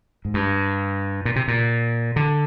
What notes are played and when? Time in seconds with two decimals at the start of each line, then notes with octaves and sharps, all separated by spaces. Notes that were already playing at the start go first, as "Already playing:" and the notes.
0.25 G#2
0.34 G2
1.25 A#2
1.36 C3
1.48 A#2
2.16 D3